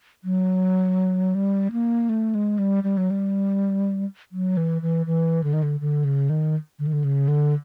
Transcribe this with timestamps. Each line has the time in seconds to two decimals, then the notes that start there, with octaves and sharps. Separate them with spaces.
0.24 F#3
1.35 G3
1.72 A#3
2.09 A3
2.35 G#3
2.59 G3
2.84 G3
2.97 F#3
3.11 G3
4.32 F#3
4.57 E3
4.82 E3
5.06 E3
5.44 D3
5.53 D#3
5.63 D3
5.80 D3
6.04 C#3
6.30 D#3
6.79 D3
6.87 D#3
6.93 D3
7.04 C#3
7.28 D3